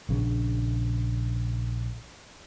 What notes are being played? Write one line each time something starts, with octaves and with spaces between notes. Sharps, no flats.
A#1 C#3 C4 D4